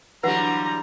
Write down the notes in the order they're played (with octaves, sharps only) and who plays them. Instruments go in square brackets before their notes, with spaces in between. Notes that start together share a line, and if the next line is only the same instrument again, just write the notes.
[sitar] G2 D3 G3 [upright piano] E3 F#3 [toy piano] B4 F#5 [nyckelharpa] A#5